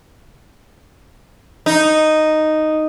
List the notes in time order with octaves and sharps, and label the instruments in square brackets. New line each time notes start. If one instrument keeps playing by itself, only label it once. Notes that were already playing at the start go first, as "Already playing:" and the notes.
[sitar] D#4